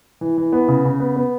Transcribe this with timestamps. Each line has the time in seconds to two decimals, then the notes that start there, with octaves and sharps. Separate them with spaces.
0.21 E3
0.38 E3
0.52 B3
0.68 C#3
0.85 C#3
1.00 B3
1.16 B3